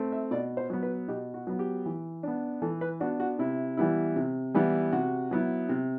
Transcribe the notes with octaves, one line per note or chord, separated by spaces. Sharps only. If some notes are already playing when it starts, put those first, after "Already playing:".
Already playing: A3 C4
E5
B2 D5
C5
F#3 B3
B4
B2 G4
F#4
F#3 B3
G4
E3
B3 D4
E3 A4
B4
B3 D4 F#4
F#4
C3 E4
E3 G3 B3 E4
C3
E3 G3 B3 E4
C3 F#4
F#3 B3 E4
C3